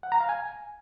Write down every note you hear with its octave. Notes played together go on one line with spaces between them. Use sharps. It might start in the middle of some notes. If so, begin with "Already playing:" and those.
F#5
A#5
F5
G#5